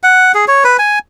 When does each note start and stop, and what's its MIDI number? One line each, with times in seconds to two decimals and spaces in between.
0.03 0.32 78
0.34 0.45 68
0.48 0.64 73
0.64 0.77 71
0.79 0.99 80